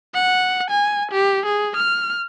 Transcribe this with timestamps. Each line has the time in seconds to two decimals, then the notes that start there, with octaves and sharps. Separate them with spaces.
0.14 F#5
0.70 G#5
1.12 G4
1.46 G#4
1.76 F6